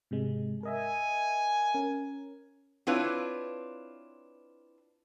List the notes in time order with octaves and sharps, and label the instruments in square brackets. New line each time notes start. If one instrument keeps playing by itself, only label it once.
[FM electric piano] G#2 C3 G#3
[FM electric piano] A#4 D#5 E5 [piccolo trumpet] G#5
[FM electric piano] C#4 A#4
[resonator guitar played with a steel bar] C4 D4 E4 F4 B4 C#5